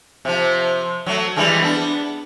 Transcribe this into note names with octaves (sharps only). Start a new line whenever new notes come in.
C3 F3
F#3 A3
E3 G3 G#3
B3 D4